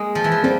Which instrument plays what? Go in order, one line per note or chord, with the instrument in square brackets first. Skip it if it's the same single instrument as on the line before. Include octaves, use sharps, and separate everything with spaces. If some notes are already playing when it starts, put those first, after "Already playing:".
Already playing: [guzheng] G#3 A#3
F3
E3
F3
[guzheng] G3 [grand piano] C4